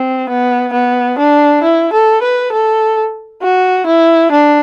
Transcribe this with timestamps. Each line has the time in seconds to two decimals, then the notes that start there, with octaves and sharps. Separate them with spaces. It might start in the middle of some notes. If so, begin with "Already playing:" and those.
Already playing: C4
0.29 B3
0.73 B3
1.18 D4
1.63 E4
1.93 A4
2.22 B4
2.52 A4
3.42 F#4
3.86 E4
4.31 D4